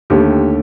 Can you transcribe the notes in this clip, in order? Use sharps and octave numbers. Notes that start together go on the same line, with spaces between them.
D#2 D3 A3 G4